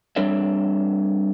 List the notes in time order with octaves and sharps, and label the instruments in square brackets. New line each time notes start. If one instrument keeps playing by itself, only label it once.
[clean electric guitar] G3 C4 D4 A4 C#5 E5